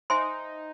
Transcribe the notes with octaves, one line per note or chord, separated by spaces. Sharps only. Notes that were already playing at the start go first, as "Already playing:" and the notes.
D#4 C5 E5 G#5 C6